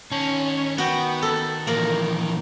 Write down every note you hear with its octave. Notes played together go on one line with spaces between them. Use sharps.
D#3 C#4 A5
B3 F#4 G5
A4
A#2 E3 F3 A#3